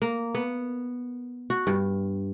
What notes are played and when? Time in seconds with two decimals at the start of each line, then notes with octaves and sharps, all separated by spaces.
0.02 A#3
0.35 B3
1.50 F#4
1.67 G2